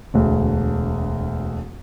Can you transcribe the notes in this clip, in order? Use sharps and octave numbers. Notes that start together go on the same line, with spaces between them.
E1 D2